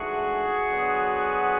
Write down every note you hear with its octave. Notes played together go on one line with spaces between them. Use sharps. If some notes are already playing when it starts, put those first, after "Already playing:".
Already playing: G#2 E3 A3 D4 F#4 G#4
D3 F#3 B3